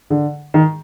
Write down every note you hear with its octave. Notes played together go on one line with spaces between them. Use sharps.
D3
D#3